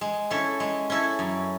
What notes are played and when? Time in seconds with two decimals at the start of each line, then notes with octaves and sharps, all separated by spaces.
0.01 G#3
0.30 C#4 E4 A4
0.60 G#3
0.90 C#4 E4 A4
1.19 F#2